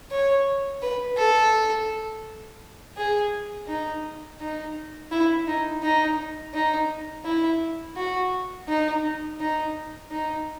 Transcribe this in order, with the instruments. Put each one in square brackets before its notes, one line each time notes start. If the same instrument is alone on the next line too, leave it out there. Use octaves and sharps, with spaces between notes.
[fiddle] C#5
B4
A4
G#4
D#4
D#4
E4
D#4
D#4
D#4
E4
F#4
D#4
D#4
D#4